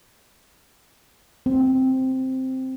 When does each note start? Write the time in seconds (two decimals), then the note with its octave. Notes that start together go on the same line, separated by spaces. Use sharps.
1.46 C4